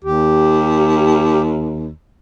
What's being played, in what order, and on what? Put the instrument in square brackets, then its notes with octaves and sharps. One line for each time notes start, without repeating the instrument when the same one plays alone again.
[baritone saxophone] D#2 [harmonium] G4